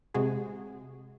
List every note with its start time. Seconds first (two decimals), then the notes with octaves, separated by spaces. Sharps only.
0.14 C3 G#3 F#4 G#4